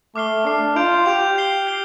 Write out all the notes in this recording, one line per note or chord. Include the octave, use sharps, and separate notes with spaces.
A3 D6 F6 C7 G7
D4 D6 F6 C7 G7
F4 G6 D7 F7
G4 G6 D7 F7
G6 C7 G7
G6 C7 G7